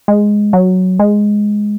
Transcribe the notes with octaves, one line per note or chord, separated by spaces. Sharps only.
G#3
F#3
G#3